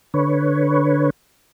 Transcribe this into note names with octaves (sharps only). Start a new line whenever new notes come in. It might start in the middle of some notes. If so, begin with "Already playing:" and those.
D3 B4 C#5